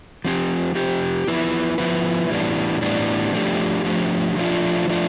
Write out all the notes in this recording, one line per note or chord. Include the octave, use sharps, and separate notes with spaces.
F3 C4 G4
F3 C4 G4
F3 B3 E4 B4
F3 B3 E4 B4
A2 E3 G3 B3 D4
A2 E3 G3 B3 D4
F3 A3 D4 G4
F3 A3 D4 G4
F3 A3 D4 F4
F3 A3 D4 F4